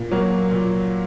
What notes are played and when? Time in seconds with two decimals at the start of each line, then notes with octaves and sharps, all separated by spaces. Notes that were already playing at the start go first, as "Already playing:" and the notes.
Already playing: A#2
0.11 F#3 A#3
0.51 A#2